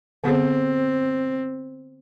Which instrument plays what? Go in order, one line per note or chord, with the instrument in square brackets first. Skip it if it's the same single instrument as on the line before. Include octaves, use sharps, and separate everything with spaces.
[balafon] D3 B3 G#4 [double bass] C4